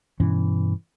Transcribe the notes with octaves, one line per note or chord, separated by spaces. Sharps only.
G2 B2 E3 C#4